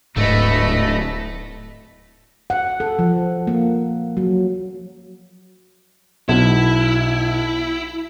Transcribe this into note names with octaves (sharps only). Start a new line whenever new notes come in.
D1 G#2 A3 B4 D#5
F#5
A4
F3
A#3
F#3
B1 E4